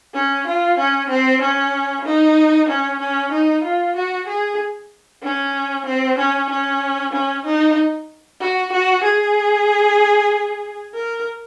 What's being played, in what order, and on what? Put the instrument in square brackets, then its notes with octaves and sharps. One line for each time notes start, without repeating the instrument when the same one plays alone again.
[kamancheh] C#4
F4
C#4
C4
C#4
D#4
C#4
C#4
D#4
F4
F#4
G#4
C#4
C4
C#4
C#4
C#4
D#4
F#4
F#4
G#4
A#4